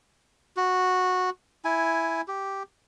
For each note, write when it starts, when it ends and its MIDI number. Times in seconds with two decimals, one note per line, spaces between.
0.57 1.30 66
1.65 2.21 64
1.65 2.21 80
2.28 2.63 67